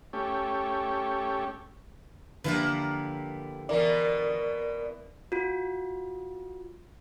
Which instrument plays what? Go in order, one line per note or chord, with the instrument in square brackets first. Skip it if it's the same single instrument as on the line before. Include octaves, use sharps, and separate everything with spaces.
[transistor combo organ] A3 C#4 G4
[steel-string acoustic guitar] D3 F3 G4 [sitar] A#3 E4 B4
[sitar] B2 E3 [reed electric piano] A#4 D5
[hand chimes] F4 F#4